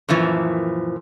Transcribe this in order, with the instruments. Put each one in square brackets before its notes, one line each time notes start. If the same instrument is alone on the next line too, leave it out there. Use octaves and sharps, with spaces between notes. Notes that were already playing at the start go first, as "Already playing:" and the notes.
[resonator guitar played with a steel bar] F#2 A#2 E3 F3